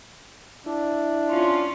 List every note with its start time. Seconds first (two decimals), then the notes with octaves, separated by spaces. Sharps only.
0.66 D4 E4
1.30 C#4 F4